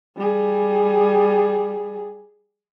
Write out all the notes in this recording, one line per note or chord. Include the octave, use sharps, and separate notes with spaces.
G3 G#4